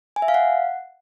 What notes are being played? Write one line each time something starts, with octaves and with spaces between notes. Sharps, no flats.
G#5
E5
F5
F#5